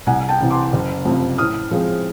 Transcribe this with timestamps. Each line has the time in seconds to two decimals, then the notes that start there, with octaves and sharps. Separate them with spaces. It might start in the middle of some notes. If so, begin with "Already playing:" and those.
0.07 C2 F#5 G#5
0.29 G5 A5
0.41 C3 E3
0.50 C6 D6
0.73 F#1
1.05 F2 C3 F3
1.38 A2 D#6 F6
1.71 F3 G#3 C4